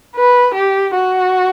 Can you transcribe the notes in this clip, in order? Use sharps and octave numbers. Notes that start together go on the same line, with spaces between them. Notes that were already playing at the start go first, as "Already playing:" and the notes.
B4
G4
F#4